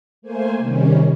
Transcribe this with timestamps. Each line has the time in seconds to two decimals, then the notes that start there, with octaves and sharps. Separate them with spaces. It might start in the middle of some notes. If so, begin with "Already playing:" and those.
0.22 A3 A#3 C5 G#5
0.58 C3 D#3 G3 C#4